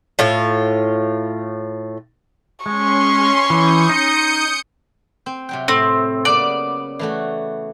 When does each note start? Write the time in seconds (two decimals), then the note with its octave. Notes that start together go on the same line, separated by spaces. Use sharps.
0.19 A2 F4
2.66 G#3 C#4 C6 C#6
3.50 E3 D#6 G6 C#7
3.89 D#4
5.26 C4
5.49 C3 F#3 G5
5.68 A2 C4
6.25 C#3 A#3 B3 D5
6.99 E3 A3 F#4